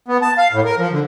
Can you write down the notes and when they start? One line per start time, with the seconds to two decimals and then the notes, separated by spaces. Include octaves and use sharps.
0.08 B3
0.22 A5
0.38 F5
0.53 A2
0.65 A#4
0.78 F3
0.91 D3